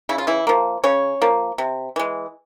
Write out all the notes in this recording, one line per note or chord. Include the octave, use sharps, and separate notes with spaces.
C#3 E4
F4
E3 E4
F3 A#3
C#3 C#4 C#5
F3 A#3
C3
E3 G#3